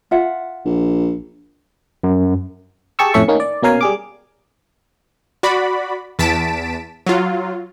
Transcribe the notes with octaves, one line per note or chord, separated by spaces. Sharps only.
F4 E5 F#5
A#1
F#2
G4 G#4 A5 C#6 E6
F2 A2 C#4 A4 E5 C#6
D#3 A#3 C#4 D#4
D5
B2 A#3 C#4 A#4 F5 G#5
G3 G#4 D6
F#4 D5 B5
E2 A5 B6 D7 E7
F#3 F4